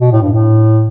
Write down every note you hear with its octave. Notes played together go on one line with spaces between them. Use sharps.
B2
A2
G2
A2